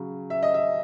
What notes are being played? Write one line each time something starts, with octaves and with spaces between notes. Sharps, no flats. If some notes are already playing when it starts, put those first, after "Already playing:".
Already playing: C#3 F#3
E5
D#5
E5